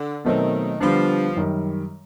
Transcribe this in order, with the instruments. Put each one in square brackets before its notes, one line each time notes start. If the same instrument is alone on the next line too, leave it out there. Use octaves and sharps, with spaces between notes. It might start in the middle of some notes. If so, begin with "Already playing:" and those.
Already playing: [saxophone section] D3
[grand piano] B2 F#3 A3 C4 [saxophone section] D#3
[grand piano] D3 G3 B3 D4 [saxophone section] F3
[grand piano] F#2 D#3 G3